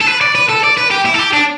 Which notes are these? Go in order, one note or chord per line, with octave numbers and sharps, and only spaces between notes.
A4
B4
D5
B4
A4
D5
B4
G4
E4
A4
G4
D4